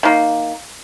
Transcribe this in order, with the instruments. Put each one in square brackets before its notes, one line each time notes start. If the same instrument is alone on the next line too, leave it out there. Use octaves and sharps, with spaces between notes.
[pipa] D#3 A#3